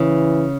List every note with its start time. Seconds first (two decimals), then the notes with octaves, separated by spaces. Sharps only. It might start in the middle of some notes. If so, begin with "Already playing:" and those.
Already playing: C#3 E3